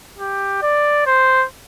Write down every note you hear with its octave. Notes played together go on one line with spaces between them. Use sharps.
G4
D5
C5